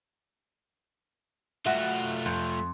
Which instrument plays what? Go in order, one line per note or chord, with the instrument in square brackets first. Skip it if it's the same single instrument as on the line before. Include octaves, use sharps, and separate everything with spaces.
[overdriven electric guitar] A3 F4 [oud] F#4 E5
[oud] F2